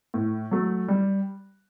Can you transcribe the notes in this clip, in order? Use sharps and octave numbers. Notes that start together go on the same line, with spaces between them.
A2
F#3 A3
G3